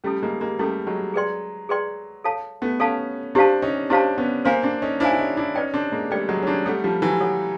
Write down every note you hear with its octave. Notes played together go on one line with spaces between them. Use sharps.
G3 A3 C#4 E4 A4
G#3 A#3
G#3 A#3
G3 A3 C#4 E4 A4
F#3 G#3
G#4 B4 D5 G5 C6
G#4 B4 D5 G5 C6
A4 C#5 F5 A5
A3 B3
B3 C#4 A4 C#5 F5 A5
C4 D4 E4 G4 C5 F5 A5
C#4 D#4
C4 D4 E4 G4 C5 F5 A5
B3 C#4
A#3 C4 C5 F5 G#5
C4 D4
C#4 D#4
D4 E4 C5 F5 G#5
E4
C#4 D#4
D4 E4
C#4 D#4 B4 D5 G5
C4 D4
G#3 A#3
G3 A3 B4 D5 G5
F#3 G#3
C#4
C4 D4
G3 A3 A4 C#5 F#5
F3 G3
E3 F#3
A4 C#5 F#5